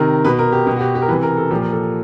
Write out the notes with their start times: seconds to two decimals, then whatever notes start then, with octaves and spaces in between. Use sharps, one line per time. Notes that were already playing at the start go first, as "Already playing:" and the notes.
Already playing: C3 D#3 A#4
0.25 B2 B4
0.39 A#4
0.52 G4
0.67 B2 G4
0.76 F#4
0.81 G4
0.95 G4
1.02 A#4
1.08 E3 B4
1.13 C3
1.23 A#4
1.37 A4
1.51 A#2 F3 G4
1.62 A#4
1.72 A4